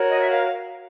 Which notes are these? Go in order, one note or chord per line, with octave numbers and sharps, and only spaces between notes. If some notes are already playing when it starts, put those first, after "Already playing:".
Already playing: F#4 A#4 C#5
D#5
E5
F5